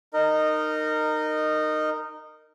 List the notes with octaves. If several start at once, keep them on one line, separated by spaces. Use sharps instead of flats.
D#4 A#4 D#5